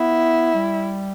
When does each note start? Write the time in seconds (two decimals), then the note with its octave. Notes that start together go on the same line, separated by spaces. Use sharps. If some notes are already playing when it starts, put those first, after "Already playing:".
Already playing: B3 E4
0.55 G3